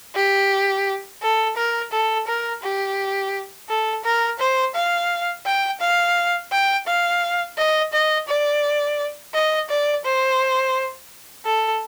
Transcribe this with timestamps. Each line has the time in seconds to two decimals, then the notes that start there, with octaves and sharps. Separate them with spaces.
0.15 G4
1.22 A4
1.57 A#4
1.92 A4
2.27 A#4
2.62 G4
3.69 A4
4.04 A#4
4.39 C5
4.75 F5
5.45 G5
5.80 F5
6.51 G5
6.87 F5
7.57 D#5
7.92 D#5
8.28 D5
9.34 D#5
9.69 D5
10.05 C5
11.45 A4